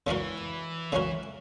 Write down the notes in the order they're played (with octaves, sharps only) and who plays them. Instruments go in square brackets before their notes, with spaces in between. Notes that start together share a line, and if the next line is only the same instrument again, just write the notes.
[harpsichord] C#3 G#3 C#4 F#4 A#4 [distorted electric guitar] E3
[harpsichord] C#3 G#3 C#4 F#4 A#4